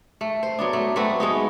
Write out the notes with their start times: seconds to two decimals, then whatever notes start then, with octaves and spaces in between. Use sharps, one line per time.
0.21 A3
0.43 C5
0.59 F#3 B3 D4
0.73 A3
0.96 A3 C4 F#4 B4
1.20 G#3 B3 D#4